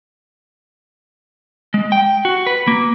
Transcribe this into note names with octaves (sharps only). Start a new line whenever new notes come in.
G#3
G5
F#4
B4
A#3